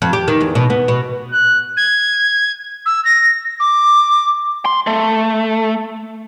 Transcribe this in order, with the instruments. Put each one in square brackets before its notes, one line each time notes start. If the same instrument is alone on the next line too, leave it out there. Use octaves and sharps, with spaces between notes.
[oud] F2
G4
D#3
E2
B2
B3
B2
[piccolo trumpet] F#6
[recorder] G#6
E6
A#6
D6
[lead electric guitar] C6
A3